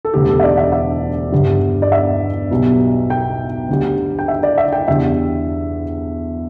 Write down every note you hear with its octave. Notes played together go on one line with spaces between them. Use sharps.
A4
E1 D2 D3 G4
A4
E5
D5
E5
E5
G1 G2 D3 G3
D5
E5
B1 B2 G3
G5
D2 D3 G3
G5
E5
D5
E5
G5
E2 D3 G3 E5